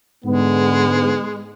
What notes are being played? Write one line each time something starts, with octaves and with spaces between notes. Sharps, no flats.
G#2 D3 G#3 B3